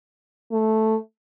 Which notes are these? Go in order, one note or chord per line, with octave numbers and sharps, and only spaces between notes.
A3